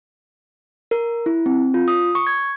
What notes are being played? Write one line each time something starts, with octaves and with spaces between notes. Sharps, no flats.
A#4
E4
C4
F4
D#6
C#6
G#6